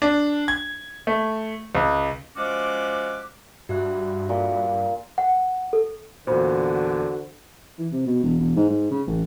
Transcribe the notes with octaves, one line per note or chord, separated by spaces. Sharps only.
D4
G#6
A3
C#2
F3 G#3 C#4 F#4 D5 D6
G2 F#4 E5 F#6
A#2
F#5
A4
E2 A#2 D3 F#4 C5 B5
E3
C3
B2
E1
E1
G#2
G#2
C#3
A1